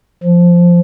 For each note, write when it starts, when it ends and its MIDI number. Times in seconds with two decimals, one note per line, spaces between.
0.24 0.80 53